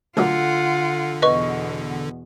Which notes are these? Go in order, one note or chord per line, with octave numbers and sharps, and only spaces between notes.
D2 A#2 D3 F#3 F4 F#5
E2 B2 B4 D#5 C#6